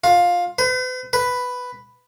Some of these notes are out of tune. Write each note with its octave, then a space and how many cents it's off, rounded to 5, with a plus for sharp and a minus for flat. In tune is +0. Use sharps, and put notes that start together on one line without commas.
F4 +15
B4 +45
B4 +5